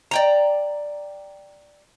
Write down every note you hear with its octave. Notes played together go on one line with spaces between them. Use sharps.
D5 G5 A#5